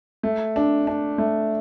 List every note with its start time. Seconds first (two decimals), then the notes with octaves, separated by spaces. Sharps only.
0.23 A3
0.56 D4
0.87 D4
1.18 A3